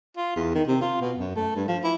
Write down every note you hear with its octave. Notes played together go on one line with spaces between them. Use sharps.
F4
E2
D#3
C3
F4
B2
F#2
A3
G2
F3
E4